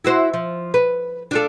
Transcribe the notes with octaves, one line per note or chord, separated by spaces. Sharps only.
E4 F#4 C5
F3
B4
D4 F4 A4